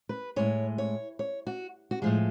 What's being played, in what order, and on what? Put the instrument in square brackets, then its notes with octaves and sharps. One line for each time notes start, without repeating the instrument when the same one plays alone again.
[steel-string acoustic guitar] B4
A2 G#3 C#5
C#5
C#5
F#4
F#4
A2 F3 G#3 G#4